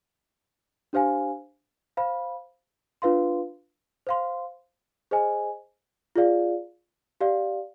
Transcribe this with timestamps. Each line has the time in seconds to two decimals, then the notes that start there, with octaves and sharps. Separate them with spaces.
0.93 D4 G4 C5 F5 G#5
1.97 C5 F5 B5
3.02 D4 F4 B4 F5 C6
4.07 C5 F5 C6
5.11 G#4 C5 D#5 G#5
6.16 F4 G#4 D5 F5
7.21 G4 D5 F5